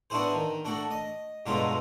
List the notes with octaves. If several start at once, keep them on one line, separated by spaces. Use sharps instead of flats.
B3 D4 E4 F#4 G#4 C5
D#3
A3 D4 F#4
D#5
G2 B2 D3 F#3 G#3 F4